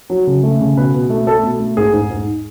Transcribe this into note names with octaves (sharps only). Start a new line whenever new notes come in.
F#3
C#3
A3
C#3
B2 B4
B2
A3
A3 A4
B2
A3
G#2 G#4
G#2
G#2